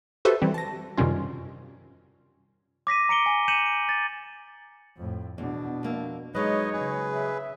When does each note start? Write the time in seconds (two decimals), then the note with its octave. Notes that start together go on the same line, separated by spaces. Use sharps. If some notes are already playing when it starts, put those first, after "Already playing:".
0.25 F#4 G4 A4 B4 C5 E5
0.42 E3 G3 C4
0.54 A5 A#6
0.97 F#2 C3 D#3 G3 C#4 F4
2.87 D6 A#6 B6 D#7
3.09 A#5 C#7 D7 G7
3.26 G#5
3.48 G6 C#7 D#7 E7 F#7
3.66 D7
3.89 A6
4.97 F2 A2
5.38 E2 B2 D4
5.83 F2 A#3 E5
6.35 F#3 G#3 D#4 B4 C#5 D#5
6.73 C#3 G#4 B4
7.13 E5